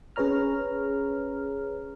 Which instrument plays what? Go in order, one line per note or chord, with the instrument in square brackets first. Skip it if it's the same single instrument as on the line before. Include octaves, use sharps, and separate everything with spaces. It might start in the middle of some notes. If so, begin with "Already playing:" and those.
[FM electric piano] C#4 G#4 B4 C#5 A#5 F6